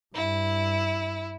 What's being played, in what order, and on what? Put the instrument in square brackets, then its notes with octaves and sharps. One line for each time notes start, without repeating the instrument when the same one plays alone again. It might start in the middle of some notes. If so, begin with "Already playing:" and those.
[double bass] G2 [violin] E4